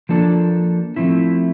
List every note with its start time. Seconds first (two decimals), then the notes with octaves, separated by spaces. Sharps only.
0.09 F3 A#3 D4 A4
0.96 F3 A3 C4 E4